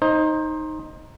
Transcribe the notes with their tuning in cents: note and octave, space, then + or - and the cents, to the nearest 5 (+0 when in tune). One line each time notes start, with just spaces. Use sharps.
D#4 +0 C5 +25